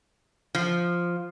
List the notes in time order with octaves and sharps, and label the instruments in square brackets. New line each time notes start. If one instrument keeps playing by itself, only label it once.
[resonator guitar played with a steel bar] F3